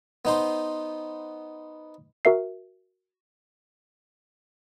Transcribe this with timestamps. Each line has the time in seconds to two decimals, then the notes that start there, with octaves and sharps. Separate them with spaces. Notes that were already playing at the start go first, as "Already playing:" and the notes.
0.25 B3 D#4 C5
2.25 F#4 A#4 E5 C7